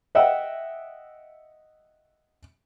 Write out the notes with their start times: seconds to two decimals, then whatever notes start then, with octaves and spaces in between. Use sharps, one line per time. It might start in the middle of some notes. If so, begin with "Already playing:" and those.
0.15 D#5 E5 F#5 G5 E6